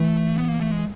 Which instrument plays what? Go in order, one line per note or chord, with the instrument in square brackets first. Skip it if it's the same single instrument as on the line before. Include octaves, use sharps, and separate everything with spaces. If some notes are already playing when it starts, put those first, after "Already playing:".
Already playing: [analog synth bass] E3 [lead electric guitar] A3
[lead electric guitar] B3
A#3
A3
G#3